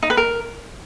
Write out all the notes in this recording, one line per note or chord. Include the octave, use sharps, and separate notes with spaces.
D#4
B4
A#4